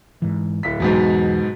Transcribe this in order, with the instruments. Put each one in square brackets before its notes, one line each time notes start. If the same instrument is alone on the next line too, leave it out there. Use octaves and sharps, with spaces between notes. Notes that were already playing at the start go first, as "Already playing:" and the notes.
[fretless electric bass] G#2 E3
[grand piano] D1 B6
[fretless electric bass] E2 [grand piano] G#2 B2 F#3